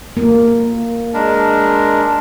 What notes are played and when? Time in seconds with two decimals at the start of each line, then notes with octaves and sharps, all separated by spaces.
0.17 A#3
1.14 G#3 D4 A#4